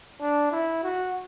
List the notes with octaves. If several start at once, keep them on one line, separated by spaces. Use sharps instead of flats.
D4
E4
F#4